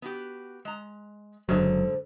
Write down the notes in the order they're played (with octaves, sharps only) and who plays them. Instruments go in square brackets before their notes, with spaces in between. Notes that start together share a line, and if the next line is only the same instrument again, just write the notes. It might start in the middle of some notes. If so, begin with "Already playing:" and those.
[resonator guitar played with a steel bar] B3 F#4 G4
G#3 A#5
[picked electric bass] F#1 F#3 [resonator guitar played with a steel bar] G#2 D3 A3 [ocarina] C5